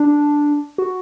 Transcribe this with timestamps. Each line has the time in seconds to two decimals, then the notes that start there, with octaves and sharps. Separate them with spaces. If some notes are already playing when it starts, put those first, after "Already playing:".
Already playing: D4
0.78 F#4